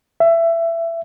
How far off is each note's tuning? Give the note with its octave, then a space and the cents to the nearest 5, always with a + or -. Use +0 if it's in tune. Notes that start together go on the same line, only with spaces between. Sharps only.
E5 +20